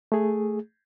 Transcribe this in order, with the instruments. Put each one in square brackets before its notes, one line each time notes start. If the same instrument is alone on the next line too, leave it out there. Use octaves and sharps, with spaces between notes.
[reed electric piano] A3 G#4